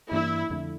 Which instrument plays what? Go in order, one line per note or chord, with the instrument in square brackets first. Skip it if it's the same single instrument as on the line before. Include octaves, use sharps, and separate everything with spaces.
[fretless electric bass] G2 E3 A#3 D4 [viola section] E4
[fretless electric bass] F2 D3 A3